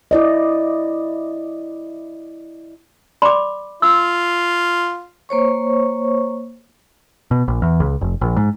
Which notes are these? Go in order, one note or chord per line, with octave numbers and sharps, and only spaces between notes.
E4 D5 D#5
D5 B5 C6 D6
F4 E6
A#3 C5 C#5 C#6
B2
A#1
E2
C#2
F1
A#1
G#2